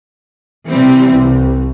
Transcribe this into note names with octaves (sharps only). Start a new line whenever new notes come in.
C3 E3 G3 C4
C2